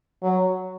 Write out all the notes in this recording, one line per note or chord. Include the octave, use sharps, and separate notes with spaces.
F#3